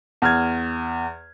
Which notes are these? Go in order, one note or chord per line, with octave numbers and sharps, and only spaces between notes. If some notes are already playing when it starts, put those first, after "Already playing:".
E2 F6 G#6